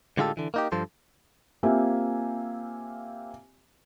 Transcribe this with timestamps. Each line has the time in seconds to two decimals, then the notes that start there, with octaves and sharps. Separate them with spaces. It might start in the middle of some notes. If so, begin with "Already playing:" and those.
0.17 A2 D3 G#3 F4 G4 A4
0.37 D3 E3
0.54 A#3 D#4 G4
0.72 G2 F3 A4 C5
1.63 A#3 C4 F4 G4 E5 G#5